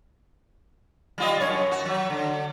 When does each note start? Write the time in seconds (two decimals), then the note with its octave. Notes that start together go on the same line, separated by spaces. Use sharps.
1.18 G3 F4 D#5
1.40 F#2 D#3 C#5
1.71 F#4
1.85 F#3
2.10 D3